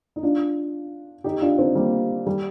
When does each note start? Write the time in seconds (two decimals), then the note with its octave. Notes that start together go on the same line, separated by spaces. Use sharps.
0.16 D#4
0.23 D4 F4
1.24 D#4 G4
1.41 D4 F4
1.59 C4 D#4
1.75 G3 A#3
2.27 G3